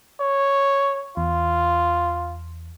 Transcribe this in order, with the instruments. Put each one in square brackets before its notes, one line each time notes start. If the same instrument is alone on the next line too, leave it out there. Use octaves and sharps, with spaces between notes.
[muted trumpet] C#5
[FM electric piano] E2 [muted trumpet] F4